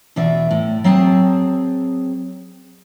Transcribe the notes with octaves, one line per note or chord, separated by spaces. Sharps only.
E2 B2 G#4 D5 E5
A2
F#3 C4 G#4 A5